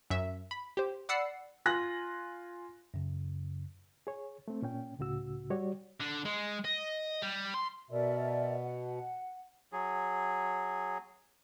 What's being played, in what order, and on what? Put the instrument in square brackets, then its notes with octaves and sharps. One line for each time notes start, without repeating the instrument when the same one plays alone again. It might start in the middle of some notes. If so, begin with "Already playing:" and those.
[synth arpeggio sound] F#2 E5
B5
G4 C5
D5 F#5 B5 E6 C7 C#7
[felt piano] F4 G#5 F#6 A#6
[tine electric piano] F#2 C#3
[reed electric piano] G#4 C#5
A3 C4
A#2 C#4 G5
C#2 A2 C#3 F#4 E6
G3 F#4 G4 C#5 D5
[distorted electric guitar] D3 D4
G#3
D#5
G3
C6
[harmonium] B2 [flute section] A#4 D5 E5
[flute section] F#5
[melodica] F#3 G#4